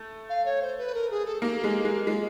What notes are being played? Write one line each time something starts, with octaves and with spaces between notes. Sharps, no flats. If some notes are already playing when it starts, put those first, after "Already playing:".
Already playing: A3
F5
C#5
C5
B4
A#4
G#4
A4
A#3 G4
G#3
G#3
G#3 F4